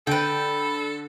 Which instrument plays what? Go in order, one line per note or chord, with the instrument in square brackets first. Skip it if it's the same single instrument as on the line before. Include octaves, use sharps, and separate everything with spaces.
[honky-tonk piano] D3 [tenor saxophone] A4 [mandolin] B4 G5